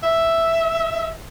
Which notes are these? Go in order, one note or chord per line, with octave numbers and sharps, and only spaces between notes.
E5